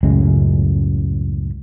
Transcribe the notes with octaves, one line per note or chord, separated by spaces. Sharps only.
C#2 F#2 A2 G#3